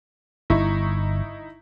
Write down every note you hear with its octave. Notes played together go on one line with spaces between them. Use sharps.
G1 D#4 E4 C#6